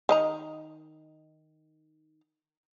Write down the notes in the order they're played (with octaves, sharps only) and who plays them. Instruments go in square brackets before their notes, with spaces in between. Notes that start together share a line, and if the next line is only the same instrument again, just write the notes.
[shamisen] D#3 D#5 A#5